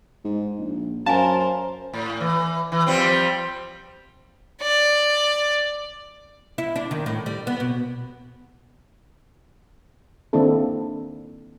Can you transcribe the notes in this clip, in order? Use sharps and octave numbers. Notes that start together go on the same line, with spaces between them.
G#2
A#1
F#2 A#4 C5 F5 G#5 A5
A2
E3
E3
F3 G3 C4
D5
E4
D4
D#3
A2
G3
B3
B2
D#3 A#3 C4 D4 E4 A4